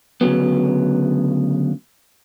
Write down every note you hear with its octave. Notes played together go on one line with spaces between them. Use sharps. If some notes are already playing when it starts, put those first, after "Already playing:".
D2 C#3 F#3 B3